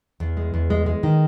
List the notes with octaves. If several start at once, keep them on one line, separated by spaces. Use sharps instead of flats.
E2
G#3
E2
G#3
G#3
D#3